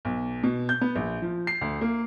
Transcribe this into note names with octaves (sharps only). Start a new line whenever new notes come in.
B1
B2
G6
B3
A#1
F3
C7
D2
A#3